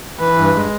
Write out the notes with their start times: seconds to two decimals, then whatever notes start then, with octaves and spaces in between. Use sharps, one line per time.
0.19 E3 B4
0.37 G2
0.54 G#3